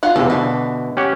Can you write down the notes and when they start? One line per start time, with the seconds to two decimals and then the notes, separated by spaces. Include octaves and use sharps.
0.03 F4 F5 F#5
0.16 E2 C3 A4
0.30 B2 D3 E3
0.97 C#4 G4 F#5